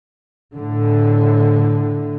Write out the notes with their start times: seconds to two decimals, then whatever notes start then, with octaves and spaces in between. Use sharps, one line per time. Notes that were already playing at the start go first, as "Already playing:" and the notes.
0.55 A2 D3